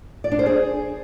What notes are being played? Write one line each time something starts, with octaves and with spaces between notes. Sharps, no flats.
D5
D4
C5
G#4